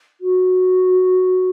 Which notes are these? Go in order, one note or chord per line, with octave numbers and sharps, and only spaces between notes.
F#4